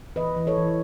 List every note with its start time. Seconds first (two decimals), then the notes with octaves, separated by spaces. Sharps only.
0.16 E3 B4 D#5
0.37 E3
0.47 A4 C#5
0.58 E3